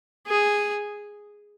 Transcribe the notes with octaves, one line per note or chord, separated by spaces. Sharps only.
G#4